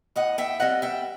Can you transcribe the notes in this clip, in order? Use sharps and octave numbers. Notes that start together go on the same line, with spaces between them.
A2 D#5 F#5
E5 G5
G3 C4 D#5 F#5
E5 G5